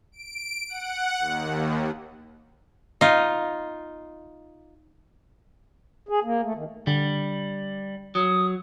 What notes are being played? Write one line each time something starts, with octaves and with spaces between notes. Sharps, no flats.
D7
F#5
D#2
D#4 F4
G#4
A#3
A3
D#3
D3 G3
F#3 D#6